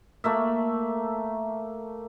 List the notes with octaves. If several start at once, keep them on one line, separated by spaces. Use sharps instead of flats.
A3 A#3 E5